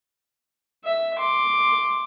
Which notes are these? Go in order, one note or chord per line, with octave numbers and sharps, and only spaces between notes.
E5
C6 D6